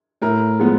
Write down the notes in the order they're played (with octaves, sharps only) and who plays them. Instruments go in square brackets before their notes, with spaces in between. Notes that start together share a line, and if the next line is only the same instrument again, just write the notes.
[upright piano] A2 A#4
F3 G#3 B3